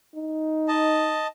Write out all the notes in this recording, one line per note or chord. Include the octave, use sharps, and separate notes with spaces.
D#4
D#5 A5